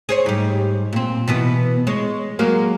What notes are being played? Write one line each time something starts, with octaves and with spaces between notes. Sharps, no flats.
G#4 C5 C#5
G#2 G3
A#2 C4
B2 E3 B3
G#3 C#5
F#3 G#3 A#3